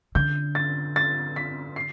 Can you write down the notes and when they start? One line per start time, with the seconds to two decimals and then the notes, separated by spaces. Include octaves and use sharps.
0.15 D3 G6
0.55 A6
0.96 A6
1.36 B6
1.76 C7